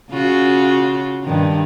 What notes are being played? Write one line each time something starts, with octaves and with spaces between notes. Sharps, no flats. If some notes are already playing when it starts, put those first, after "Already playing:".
C#3 F4 F#4
G2 D#3